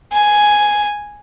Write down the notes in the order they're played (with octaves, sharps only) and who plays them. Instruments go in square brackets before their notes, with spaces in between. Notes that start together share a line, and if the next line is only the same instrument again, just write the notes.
[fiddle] G#5